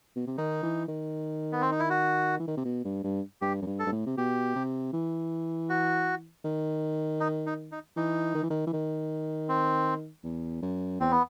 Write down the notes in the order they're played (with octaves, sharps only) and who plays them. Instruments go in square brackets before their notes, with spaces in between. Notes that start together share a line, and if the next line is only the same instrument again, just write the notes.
[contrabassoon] B2
C3
[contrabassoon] D#3 [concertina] D#4
[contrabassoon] E3
D#3
[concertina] B3
C4
D#4
E4
F#4
[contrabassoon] E3
D#3
C3
B2
G2
G2
[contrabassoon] G2 [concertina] G4
[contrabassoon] F#2
G2
[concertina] A4
[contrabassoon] G2
A2
C3
[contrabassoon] B2 [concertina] G4
[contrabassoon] C3
E3
[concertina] F#4
[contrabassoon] D#3
[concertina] D#4
D#4
D#4
[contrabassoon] E3 [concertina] D#4
[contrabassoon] D#3
E3
D#3
E3
D#3
[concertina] C4
[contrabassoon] E2
F#2
[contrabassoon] E2 [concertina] C4
[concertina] B3